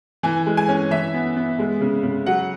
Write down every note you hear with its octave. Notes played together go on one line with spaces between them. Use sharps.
E3 G#5
G#3
G#5
C#4
E3 E5
B3
B3
G#3
C#3
C#3
F#3 F#5